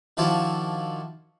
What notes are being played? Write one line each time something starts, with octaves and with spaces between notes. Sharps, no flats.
D#3 F3 D4 E4 F#4 C5